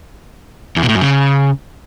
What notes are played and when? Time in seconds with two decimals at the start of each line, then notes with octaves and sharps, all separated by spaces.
0.76 E2
0.83 B2
0.89 A2
0.95 F#2
1.01 C#3